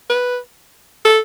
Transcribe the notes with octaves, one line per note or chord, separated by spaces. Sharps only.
B4
A4